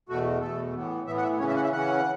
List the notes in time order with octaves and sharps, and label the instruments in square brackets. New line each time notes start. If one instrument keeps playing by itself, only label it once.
[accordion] E2 B2 A3 F#4
E2 B2 A3 A4
A2 E3 B3
A2 E3 B3 E5
F#5
E5
C#3 E3 C#4 C#5
E5
F#5
E5
C#3 E3 C#4 F#5